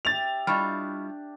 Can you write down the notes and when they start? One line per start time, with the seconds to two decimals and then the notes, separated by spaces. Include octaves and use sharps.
0.05 G4 E5 A6 F7
0.47 G3 D4 E4 F4 D#5 C#6 F6